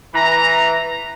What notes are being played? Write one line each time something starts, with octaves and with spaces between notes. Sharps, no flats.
E3 A#5